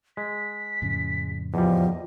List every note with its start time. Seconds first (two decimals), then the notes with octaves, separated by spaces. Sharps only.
0.17 G#3 B6
0.82 F2 A2 C#3
1.54 E2 F3 G3 D#5